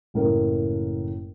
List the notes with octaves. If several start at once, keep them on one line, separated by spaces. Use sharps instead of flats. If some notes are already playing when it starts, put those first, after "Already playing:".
F#1 A2 A#4